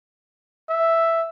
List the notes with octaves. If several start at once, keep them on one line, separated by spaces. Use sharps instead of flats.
E5